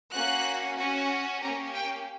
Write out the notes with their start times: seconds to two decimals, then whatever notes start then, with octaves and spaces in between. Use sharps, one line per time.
0.13 A#3 C#4 F#4 F#6
0.77 C#4 F#4
1.41 A#3 C#4 G4 A#5
1.75 G5